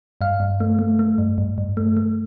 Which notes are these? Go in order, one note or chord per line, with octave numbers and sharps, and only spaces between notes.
G2 F5
G2
A3
A3
A3
G2
G2
G2
A3
A3